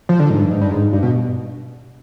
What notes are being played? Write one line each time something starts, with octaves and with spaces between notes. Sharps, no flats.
F3
D3
G#2
G2
G#2
G2
G#2
G2
B2